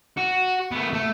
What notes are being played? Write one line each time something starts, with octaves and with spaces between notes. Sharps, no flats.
F#4
A3 B3
A3